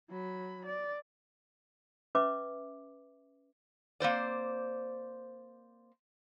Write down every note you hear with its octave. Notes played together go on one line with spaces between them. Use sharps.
F#3 B5
D5
C#4 B4 E5 D6
A#3 C4 C5 D5